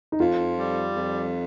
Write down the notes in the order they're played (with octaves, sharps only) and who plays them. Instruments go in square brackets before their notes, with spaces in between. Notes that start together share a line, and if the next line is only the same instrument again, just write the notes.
[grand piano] D#4
[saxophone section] F2 [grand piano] F4
[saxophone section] G3
F2